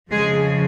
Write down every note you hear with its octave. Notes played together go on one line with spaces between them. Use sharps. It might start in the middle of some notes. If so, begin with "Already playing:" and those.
F2 C#3 F3 G#3 G#4